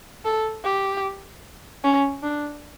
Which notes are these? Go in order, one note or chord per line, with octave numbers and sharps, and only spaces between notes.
A4
G4
C#4
D4